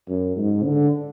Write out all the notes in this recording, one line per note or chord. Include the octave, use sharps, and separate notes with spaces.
F#2
G#2
D3